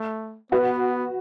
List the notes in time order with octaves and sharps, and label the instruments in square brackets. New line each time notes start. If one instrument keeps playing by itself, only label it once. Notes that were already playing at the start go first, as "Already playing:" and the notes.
Already playing: [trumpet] A3
[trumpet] B3 [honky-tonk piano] F#4 B4